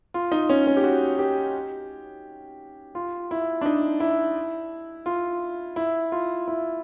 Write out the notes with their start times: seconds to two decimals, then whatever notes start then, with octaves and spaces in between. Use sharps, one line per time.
0.14 F4
0.32 D#4
0.49 C#4
0.67 C#4
0.77 G4
0.84 F#4
1.19 G4
2.95 F4
3.31 E4
3.61 D4
3.66 D#4
4.00 E4
5.06 F4
5.76 E4
6.12 F4
6.48 E4